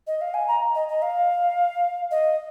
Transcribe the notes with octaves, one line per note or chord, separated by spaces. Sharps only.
D#5
F5
G#5
A#5
D#5
D#5
F5
D#5